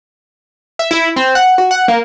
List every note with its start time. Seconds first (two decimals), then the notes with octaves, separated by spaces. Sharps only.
0.79 E5
0.91 E4
1.16 C4
1.35 F#5
1.58 F#4
1.71 F#5
1.88 A#3